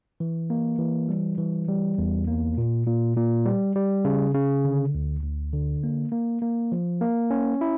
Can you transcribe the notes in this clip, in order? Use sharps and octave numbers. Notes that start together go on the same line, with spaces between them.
E3
A#3
E3
G3
E3
G3
E2
A#3
A#2
A#2
A#2
G3
G3
C#3
C#3
D3
D2
D2
D3
A#3
A#3
A#3
F3
A#3
C#4
E4